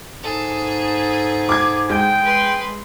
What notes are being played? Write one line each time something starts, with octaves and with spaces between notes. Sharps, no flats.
G#2 G#4 A4
D6 G#6
G#3 G5 G6
B4 C6